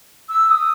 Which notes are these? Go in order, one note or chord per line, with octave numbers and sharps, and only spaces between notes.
E6
E6
D#6